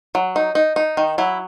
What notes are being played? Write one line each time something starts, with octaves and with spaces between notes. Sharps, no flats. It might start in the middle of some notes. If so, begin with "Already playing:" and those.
F#3
D#4
D#4
D#4
D#3
F#3 E4